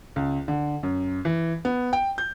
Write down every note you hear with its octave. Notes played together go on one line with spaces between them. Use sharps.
C#2
D3
F#2
E3
B3
G5
G6